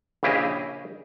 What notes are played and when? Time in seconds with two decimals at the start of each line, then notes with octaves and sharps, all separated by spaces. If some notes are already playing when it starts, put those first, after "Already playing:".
0.23 A#1 C#3 E4 G4 G#4 D#5